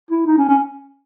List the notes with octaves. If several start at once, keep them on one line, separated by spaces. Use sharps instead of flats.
E4
D#4
C#4
C#4